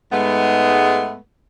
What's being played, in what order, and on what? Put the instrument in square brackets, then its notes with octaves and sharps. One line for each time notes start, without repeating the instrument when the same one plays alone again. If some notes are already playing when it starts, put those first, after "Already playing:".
[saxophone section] G#2 G#3 A3 B3